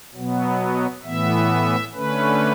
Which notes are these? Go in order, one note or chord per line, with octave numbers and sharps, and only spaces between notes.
B2 F#3 B3
A2 E3 B3 E5
D3 A3 C#4 B4